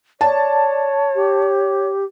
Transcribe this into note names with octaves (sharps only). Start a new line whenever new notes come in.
C#5 D5 A5
G4